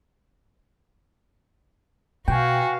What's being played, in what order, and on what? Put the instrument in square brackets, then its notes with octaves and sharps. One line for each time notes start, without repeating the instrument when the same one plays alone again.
[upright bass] B2 [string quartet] F#4 [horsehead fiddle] B4 F5 [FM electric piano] G5 G#5